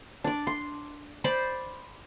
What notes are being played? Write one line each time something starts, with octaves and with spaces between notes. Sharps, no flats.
D4 D5
C6
C5 D5 B5